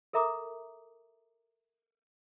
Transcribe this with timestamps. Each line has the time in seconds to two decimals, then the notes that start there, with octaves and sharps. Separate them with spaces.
0.13 A4 A#4 E5 A#5 D6 D#6